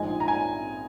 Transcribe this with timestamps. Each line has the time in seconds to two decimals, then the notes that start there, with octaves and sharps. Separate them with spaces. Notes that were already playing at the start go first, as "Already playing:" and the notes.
Already playing: A#1 G#2 G#3 D#5 G#5
0.20 A#5
0.28 G#5